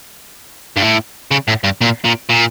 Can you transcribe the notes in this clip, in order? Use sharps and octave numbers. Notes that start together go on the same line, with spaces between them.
G2
A2
C#3
A2
G2
A#2
A#2
A#2